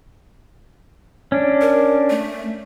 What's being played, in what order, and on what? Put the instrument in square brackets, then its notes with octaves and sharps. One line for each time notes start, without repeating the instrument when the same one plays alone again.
[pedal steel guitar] C#4 D4
[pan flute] A#4
A3